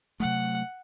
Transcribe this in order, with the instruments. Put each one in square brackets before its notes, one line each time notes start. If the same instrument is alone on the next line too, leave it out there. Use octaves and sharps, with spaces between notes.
[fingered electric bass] C3 F#3 A3 [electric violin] F#5